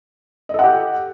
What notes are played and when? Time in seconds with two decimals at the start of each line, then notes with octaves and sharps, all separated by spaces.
0.49 D#5
0.54 A4
0.59 F#5
0.64 G4